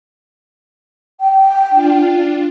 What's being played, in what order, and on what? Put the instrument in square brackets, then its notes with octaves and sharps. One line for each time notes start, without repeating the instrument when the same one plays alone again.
[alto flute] G5
[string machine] D4 F4